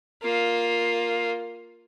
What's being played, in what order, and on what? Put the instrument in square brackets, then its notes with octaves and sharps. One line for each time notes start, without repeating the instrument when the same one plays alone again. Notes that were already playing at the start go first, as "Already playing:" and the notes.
[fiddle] A#3 F4